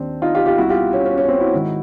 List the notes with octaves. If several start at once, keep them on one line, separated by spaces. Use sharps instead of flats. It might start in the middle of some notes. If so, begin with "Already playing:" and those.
Already playing: D#2 D#3 C4 D4
D#4 F4
F4 G4
F4 G4
C2 B2 E4 F#4
F4 G4
C#4
C#4
C#4
C4
E4 F#4
G#2 D#3